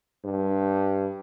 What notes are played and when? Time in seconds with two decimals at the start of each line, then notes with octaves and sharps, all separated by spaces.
0.25 G2